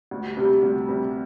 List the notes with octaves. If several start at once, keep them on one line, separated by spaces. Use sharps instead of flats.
D2
C3 G3
D2
C3 G3